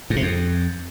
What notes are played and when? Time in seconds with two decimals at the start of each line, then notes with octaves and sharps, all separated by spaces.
0.10 G#2
0.16 C3
0.22 F2